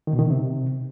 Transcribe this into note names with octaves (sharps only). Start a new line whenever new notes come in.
D#3
B2
D#3
E3
C3